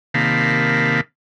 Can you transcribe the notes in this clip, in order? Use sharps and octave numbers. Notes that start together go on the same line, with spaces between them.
C3 D#3 A#3 F5 A5 B5